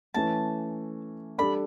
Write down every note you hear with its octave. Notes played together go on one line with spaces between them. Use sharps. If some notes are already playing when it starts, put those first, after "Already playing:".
E3 A3 C#4 A5
G3 D4 A4 D5 B5